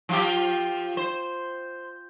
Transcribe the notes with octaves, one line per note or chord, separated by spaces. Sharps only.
F3 F4 G4
C5